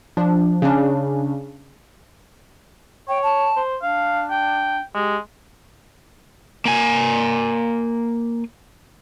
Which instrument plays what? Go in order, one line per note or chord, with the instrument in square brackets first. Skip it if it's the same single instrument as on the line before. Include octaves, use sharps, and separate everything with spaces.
[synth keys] F3 D4
C#3 C#4 D4
[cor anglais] C#5 [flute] G5
[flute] A5
[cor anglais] C5
[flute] D4 [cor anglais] F5
[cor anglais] G5
[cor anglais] G#3 [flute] G4
[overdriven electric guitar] A#3 G#5